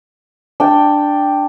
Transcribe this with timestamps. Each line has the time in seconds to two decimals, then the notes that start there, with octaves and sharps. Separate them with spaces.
0.60 D4 G5